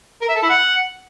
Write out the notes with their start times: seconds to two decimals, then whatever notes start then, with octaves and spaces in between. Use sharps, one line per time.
0.22 A#4
0.28 E5
0.35 A4
0.42 E4
0.49 F#5